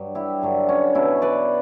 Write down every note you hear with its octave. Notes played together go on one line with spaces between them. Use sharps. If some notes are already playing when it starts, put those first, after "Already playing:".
Already playing: G2 F#3
E4 G4
G2 D3 F#3
C#4
B2 F#3 C#4 E4
B4 D5